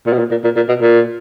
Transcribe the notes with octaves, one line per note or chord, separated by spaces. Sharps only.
A#2
B2
A#2
A#2
A#2
A#2
B2
A#2